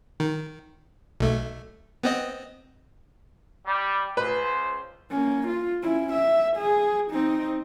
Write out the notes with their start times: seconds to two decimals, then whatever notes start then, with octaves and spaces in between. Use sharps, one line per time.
0.20 D#3
1.20 B1 A3
2.03 B3 C4 D#5
3.66 G3
4.17 C#2 B4 C5
5.10 A#3 C#4
5.47 F4
5.82 C#4 E4
6.13 E5
6.57 G#4
7.11 C4 D#4